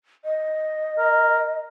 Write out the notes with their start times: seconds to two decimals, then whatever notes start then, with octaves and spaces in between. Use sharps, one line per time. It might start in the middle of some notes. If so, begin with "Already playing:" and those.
0.25 D#5
0.99 A#4